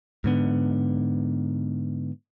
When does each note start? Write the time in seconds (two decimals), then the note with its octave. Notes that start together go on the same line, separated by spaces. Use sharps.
0.24 G#2 D3 B3